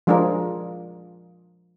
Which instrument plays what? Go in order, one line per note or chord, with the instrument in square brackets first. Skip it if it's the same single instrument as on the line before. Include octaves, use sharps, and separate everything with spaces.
[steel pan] F3 G#3 D4 F4 G#4 A#4